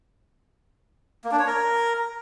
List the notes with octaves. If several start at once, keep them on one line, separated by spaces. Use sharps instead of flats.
A#3
D4
C#5
A#4